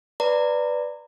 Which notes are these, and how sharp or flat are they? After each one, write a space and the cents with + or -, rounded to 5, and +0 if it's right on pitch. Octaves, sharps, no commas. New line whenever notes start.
B4 +0 D5 +0 A#5 -25